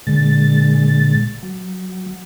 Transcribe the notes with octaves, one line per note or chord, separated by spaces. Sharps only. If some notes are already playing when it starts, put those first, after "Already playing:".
A#2 D3 G#3 A6
F#3